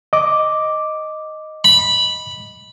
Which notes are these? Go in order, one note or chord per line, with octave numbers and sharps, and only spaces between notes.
D#5 D6
B5